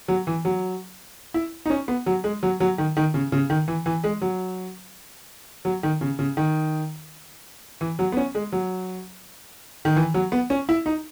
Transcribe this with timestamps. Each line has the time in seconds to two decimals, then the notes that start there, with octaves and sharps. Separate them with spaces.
0.08 F#3
0.27 E3
0.45 F#3
1.34 E4
1.66 D#4
1.70 C#4
1.88 B3
2.06 F#3
2.24 G#3
2.43 F#3
2.60 F#3
2.78 D#3
2.97 D#3
3.14 C#3
3.32 C#3
3.50 D#3
3.68 E3
3.86 E3
4.04 G#3
4.22 F#3
5.65 F#3
5.83 D#3
6.01 C#3
6.19 C#3
6.37 D#3
7.81 E3
7.99 F#3
8.12 B3
8.17 C#4
8.35 G#3
8.52 F#3
9.85 D#3
9.96 E3
10.14 F#3
10.32 B3
10.50 C#4
10.69 E4
10.86 D#4